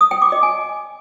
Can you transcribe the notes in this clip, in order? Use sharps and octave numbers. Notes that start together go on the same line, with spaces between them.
D#6
G5
D6
D#5
G#5